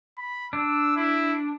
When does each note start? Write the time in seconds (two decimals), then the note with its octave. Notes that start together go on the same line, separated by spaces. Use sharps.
0.18 B5
0.53 D4 E6
0.96 E4